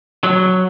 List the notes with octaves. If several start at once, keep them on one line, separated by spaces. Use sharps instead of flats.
F#3